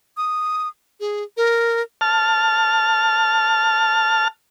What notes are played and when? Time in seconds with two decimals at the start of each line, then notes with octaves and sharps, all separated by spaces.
0.17 D#6
1.00 G#4
1.37 A#4
2.01 A5 F6